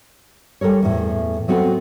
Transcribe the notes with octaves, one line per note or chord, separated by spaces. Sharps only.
G3 A4 A#4 C#5
E2 A2
F#3 B3 C4 F#4 A4 C5